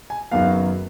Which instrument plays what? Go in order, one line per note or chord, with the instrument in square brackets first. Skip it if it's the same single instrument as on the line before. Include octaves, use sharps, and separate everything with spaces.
[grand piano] G#5
F#1 F#2 D#3 F#3 B3 F5